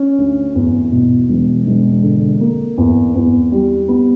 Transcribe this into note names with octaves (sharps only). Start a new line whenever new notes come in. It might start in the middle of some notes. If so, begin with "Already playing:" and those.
Already playing: C#4
D2
E2
B2
E1
E1
D3
A#3
E2
E2
G3
B3